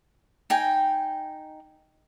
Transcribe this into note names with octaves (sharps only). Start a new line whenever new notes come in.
D#4 G5 G#5